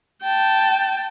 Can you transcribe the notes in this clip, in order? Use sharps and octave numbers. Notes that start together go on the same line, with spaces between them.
G5 A5